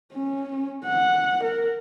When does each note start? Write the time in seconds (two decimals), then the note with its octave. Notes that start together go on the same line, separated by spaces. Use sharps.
0.13 C#4
0.85 F#5
1.43 A#4